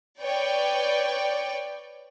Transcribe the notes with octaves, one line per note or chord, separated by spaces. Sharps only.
B4 C#5 D5 G5